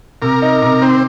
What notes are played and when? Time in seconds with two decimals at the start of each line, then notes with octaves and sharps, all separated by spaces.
0.22 C3 A#4
0.42 D#4
0.62 C3
0.82 D#3 C4